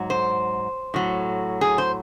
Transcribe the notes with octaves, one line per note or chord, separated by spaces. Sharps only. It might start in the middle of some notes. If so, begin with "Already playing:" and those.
Already playing: G#2 F#3
C5
A2 F#3
G#4
C5